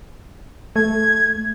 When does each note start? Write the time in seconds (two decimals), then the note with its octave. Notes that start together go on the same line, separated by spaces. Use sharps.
0.76 A3 G#6